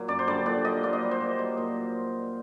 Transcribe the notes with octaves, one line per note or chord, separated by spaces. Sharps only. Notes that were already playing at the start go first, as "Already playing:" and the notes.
Already playing: A#2 F#3
F#2 D5
C5
D3 G3 D5
A#2 D5
F#3 D#5
A#2 D5
D#5
G3
C5
A#2
F#3
A#2